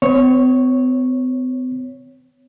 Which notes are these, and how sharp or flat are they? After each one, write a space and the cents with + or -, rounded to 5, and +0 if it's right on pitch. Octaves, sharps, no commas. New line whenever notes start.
C4 -45 C#5 +0